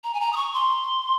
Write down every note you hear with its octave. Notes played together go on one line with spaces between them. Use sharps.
A#5
G#5
A#5
D#6
C#6
C6